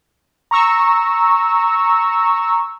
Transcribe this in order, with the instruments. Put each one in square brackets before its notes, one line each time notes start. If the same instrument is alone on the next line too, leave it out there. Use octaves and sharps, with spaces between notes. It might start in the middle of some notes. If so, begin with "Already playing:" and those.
[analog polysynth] A#5 C#6 E6